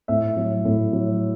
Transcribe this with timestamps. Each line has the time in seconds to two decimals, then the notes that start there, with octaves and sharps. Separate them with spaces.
0.08 A2 E5
0.37 F#3
0.65 A2
0.93 F#3